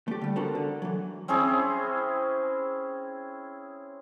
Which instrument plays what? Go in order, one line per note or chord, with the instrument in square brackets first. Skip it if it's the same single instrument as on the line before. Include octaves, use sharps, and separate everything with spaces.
[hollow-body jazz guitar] A3 G4
D3 G3
B3 D4 F#4 A4 A#4 C5
D3
E3 F#3
[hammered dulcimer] C4 C#4 E4 G#4